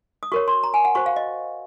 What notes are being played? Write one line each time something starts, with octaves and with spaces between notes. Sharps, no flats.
D#6
F#4 A#4 C#5 C#6
C6
A#5
G#5
F#5
F#4 C5 C#6
F5
D#5